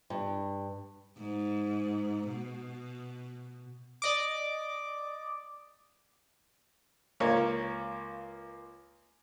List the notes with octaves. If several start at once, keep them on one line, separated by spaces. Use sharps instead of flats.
G2
G#2
B2
D5 D#5 D6
C#2 A#3 C#5